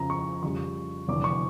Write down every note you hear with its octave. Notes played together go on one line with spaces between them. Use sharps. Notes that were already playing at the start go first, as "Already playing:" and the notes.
Already playing: F2 C#3 F3 A#5
C#6
F2 C#3 G3 C#6
F1 E2 D3 D6
C#6